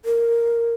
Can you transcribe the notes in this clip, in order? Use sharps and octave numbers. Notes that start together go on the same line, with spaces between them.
A#4